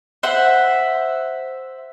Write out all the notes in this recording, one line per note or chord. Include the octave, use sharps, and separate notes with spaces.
C5 E5 F#5